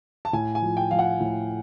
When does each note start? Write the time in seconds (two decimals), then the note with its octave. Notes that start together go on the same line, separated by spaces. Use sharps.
0.25 A5
0.33 A2 G#5
0.55 G#5
0.62 F3
0.77 G5
0.91 F3 F5
0.99 F#5
1.20 A2